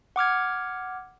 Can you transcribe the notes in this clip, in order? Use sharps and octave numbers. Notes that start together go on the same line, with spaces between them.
F#5 D6 F6 G#6